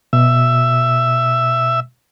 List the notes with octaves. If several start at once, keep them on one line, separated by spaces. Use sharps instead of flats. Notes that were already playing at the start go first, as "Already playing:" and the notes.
B2 E5